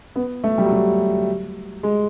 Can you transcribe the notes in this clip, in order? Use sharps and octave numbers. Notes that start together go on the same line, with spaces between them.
B3
A3
G3
F#3
G3
G#3